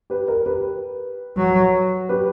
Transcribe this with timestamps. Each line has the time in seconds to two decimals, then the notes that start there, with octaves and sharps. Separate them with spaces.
0.10 G4 B4
0.28 A#4
0.46 G4 B4
1.37 F#3
2.09 G4 B4